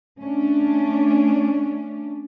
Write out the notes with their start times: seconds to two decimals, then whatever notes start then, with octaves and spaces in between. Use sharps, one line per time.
0.19 A3 C#4 D4